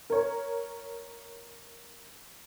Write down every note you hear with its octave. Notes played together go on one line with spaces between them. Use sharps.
A#4 C#5